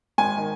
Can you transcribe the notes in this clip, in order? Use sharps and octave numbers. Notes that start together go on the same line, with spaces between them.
G#1 G#5
D#3